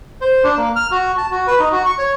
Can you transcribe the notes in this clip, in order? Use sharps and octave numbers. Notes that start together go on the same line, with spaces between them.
C5
D4
A#3
F6
F#4
A5
F#4
B4
D#4
F#4
C#6
C#5